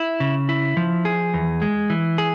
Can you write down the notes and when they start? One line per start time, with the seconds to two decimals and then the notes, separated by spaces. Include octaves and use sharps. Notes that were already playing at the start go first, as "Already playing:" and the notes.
Already playing: E4
0.20 C#3
0.49 E4
0.77 F3
1.05 G#4
1.34 E2
1.62 G#3
1.90 E3
2.18 G#4